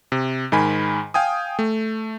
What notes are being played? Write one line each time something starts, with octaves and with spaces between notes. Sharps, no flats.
C3
G#2 D#3 G#5 B5
F5 G5 G#5 D#6
A3